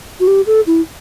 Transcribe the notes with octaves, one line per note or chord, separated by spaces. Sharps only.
F#4
G4
A4
E4